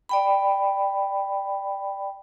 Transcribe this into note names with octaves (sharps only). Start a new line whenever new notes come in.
D5 G5 B5